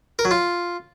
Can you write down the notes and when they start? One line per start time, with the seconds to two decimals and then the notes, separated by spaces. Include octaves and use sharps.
0.19 A#4
0.25 F#3
0.31 F4